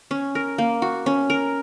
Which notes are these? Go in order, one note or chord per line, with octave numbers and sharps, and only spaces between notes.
C#4
A#4
A#3
F#4
C#4
A#4